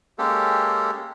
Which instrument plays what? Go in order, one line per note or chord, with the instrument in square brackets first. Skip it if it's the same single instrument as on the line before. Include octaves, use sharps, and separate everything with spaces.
[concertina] G#3 A#3 C#4 G4 A4